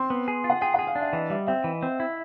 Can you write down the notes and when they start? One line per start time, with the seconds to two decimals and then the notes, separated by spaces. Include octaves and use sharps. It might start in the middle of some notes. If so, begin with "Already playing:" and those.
Already playing: C4 C6
0.10 B3
0.28 G#4
0.44 F4
0.50 F#5
0.61 G#4 G5
0.74 G#4 F#5
0.87 F5
0.95 D4 E5
1.13 E3 D#5
1.30 G3 E5
1.47 C4 E5
1.64 E3
1.83 C4
2.00 E4